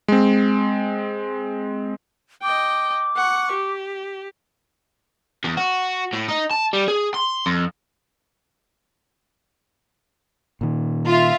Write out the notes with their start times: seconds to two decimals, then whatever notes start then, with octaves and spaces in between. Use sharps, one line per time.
0.08 G#3 C4
2.43 D#5 G5 D6
3.16 F#5 C#6
3.52 G4
5.44 E2
5.57 F#4
6.13 A2
6.28 D#4
6.51 A5
6.73 G3
6.88 G#4
7.14 C6
7.46 F2
10.61 A#2 D#3
11.06 F4 E5